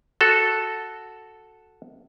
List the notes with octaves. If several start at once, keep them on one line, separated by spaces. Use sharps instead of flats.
F#4 A4